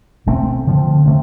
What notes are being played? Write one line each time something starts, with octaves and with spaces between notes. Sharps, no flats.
B2 A3 C4
D3 F3 C4
D3 A3 C4